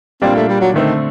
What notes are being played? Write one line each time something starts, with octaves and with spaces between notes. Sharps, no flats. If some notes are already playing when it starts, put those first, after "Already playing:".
A#2 G3 A#3 C4 D4
A3
G3
F#3
D3 D#3 A3 C4